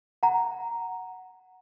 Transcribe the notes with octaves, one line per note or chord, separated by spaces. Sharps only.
F#5 A#5